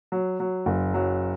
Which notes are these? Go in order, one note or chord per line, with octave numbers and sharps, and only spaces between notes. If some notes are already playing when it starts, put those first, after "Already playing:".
F#3
F#3
F#1
F#3